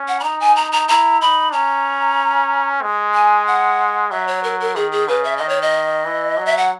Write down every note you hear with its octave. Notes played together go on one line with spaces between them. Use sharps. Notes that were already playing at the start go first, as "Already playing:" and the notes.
Already playing: C#4
F#5
B5
D#4 A#5
G#5
A#5
A#5
E4 A#5
D#4 B5
C#4 A#5
G#3
G#5
F#5
F#3 E5
C#5
A#4
A#4
D#3 G#4
G#4
C#3 B4
E5
D#3 D#5
C#5
D#5
E3
F#3
E5
F#5